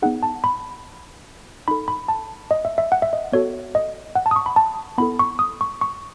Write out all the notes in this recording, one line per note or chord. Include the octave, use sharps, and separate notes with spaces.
B3 D#4 G#4 F#5
A5
B5
D#4 A4 B5
B5
A5
D#5
E5
E5
F#5
E5
D#5
B3 F#4 A4 C#5
D#5
F#5
A5
D#6
C#6
B5
A5
B3 E4 A4 B5
C#6
D#6
C#6
C#6